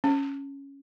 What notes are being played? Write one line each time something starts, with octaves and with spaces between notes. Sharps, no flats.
C#4